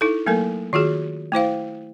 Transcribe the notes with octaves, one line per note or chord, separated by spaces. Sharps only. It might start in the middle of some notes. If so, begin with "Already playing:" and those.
D#4 E4 A4
F#3 A3 A#3 A4 A#4
D#3 F4 F#4 G#4
A3 E4 C5 F5